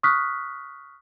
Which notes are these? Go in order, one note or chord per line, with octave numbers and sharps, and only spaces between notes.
C#6 D#6 F6 F#6 B6